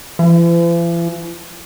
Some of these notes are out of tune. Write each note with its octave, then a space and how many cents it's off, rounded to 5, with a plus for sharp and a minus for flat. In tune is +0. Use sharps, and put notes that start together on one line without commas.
E3 +45